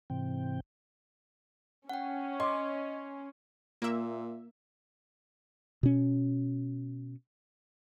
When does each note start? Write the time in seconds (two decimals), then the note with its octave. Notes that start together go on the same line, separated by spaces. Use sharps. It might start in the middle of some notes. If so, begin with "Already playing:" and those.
0.10 G#2 C3 E3 C4 G5
1.89 C#4 F#5 G5
2.40 D#5 C6 D6
3.82 A#2 A#3 E5
5.83 B2 C#4